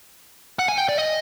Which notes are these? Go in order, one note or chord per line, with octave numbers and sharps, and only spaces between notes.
F#5
G#5
G5
D5
D#5